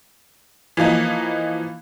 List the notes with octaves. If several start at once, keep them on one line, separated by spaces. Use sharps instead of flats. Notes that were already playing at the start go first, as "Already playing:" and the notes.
E3 F3 A#3 D#4